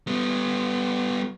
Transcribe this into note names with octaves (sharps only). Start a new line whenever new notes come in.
G3 B3